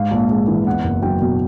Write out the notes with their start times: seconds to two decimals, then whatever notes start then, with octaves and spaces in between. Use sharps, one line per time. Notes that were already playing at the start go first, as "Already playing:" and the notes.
Already playing: G#2 F5
0.11 A#1
0.30 G#3
0.48 E3
0.66 E2 F#5
0.84 F#1
1.02 F#3 G5
1.22 B2